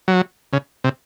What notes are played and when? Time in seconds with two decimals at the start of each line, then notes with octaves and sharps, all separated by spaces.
0.08 F#3
0.53 C#3
0.84 C3